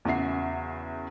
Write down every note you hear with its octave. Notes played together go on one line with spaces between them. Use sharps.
E2 C#3 F#4 E5 C7